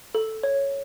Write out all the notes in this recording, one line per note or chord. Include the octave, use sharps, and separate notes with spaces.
A4
C#5